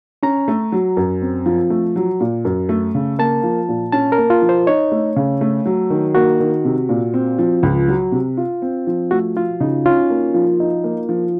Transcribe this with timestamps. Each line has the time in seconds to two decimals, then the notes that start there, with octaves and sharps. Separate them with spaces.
0.23 C#4 A#5
0.48 A3
0.72 F#3
0.97 F#2
1.22 C4
1.46 F3
1.70 A3
1.96 F#3
2.20 A#2
2.45 F#2
2.69 A3
2.95 C#3
3.19 A#3 A5
3.43 F3
3.69 A#2
3.92 C#4 A5
4.12 A#4
4.18 A#3
4.30 F4
4.42 F3
4.49 C5
4.67 D#4 C#5
4.92 A3
5.16 C#3
5.41 A3
5.66 F#3
5.90 D#3
6.15 A#3 F#4
6.40 D#3
6.65 C3
6.89 A#2
7.14 C4
7.39 F3
7.63 C#2
7.88 F#3
8.12 C3
8.37 F4
8.62 C4
8.87 F3
9.11 A3 F#4
9.36 F3 F4
9.60 C#3 D#4
9.86 C#4 F4
10.10 A#3
10.34 F3
10.60 D#4
10.84 A#3
11.09 F3